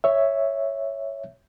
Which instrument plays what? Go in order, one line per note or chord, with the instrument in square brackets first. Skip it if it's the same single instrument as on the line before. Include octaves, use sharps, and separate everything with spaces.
[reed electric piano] C#5 E5